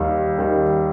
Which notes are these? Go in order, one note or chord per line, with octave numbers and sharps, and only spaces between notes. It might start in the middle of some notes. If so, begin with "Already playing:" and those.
Already playing: D#2 D#3 G3
D#2 D#3 G3